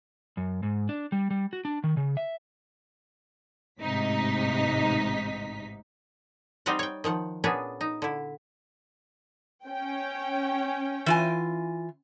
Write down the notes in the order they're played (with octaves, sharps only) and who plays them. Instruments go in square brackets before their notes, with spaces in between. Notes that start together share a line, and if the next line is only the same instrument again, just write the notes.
[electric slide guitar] F#2
G#2
D4
G3
G3
F#4
D4
D#3
C#3
E5
[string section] A1 G#2 C3 D#4 B6
[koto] G3 C4 D#4 G4 F5 F#5
C#5 G5
D#3 F3 F#5
A#2 B3 C#4 D4 G#4
D#4
D3 E4
[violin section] C#4 G5
[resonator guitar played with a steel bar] E3 F4 G#5